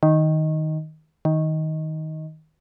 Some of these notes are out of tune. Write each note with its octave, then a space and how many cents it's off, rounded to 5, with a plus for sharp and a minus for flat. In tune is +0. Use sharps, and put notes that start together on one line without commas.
D#3 +5
D#3 +15